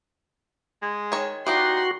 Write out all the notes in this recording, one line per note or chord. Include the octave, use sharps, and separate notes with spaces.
G#3
D#3 C#5
E3 D#4 F#4 G4 D5 C6